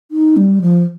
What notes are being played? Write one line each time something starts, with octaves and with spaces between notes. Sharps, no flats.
D#4
G3
F3